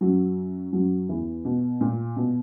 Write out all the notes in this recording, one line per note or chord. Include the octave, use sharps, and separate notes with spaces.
F#2 F#3
F#2 F#3
E2 E3
B2
A#2
B2